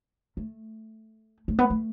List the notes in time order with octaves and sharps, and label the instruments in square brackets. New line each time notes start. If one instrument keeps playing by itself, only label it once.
[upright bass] A3
A3
B3
A3